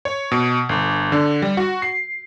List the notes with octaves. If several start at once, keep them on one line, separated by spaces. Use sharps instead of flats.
C#5
B2
G1
D3
G3
F#4
C7